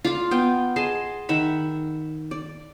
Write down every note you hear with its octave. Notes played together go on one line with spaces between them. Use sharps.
F4 D5 F5
B3 G5
G#4 D#5 A5 C6
D#3 E5 F#5 B5
D5